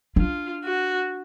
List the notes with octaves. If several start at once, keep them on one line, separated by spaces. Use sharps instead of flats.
D4 F4
F#4